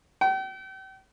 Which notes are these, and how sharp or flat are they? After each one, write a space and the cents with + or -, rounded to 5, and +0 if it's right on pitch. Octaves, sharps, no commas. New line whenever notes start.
G5 -40